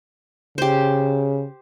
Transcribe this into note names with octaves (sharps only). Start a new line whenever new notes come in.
C#3 G4 C5